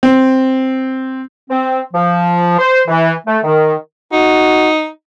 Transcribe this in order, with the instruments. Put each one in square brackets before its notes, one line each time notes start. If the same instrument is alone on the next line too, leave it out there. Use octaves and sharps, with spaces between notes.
[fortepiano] C4
[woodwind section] C4
F3
C5
E3
A3
D#3
[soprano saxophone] D#4 [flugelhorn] F#4